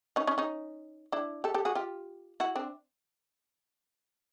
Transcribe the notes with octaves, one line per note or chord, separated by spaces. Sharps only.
C#4 D#4
C#4 D#4
C#4 D#4
D4 E4
G4 A4
G4 A4
F#4 G#4
F4 G4
E4 F#4
C4 D4